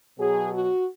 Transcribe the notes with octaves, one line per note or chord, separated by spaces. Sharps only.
B2 F#3 G#4
F#4